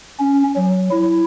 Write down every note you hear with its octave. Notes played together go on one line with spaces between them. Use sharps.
C#4
F#3
E4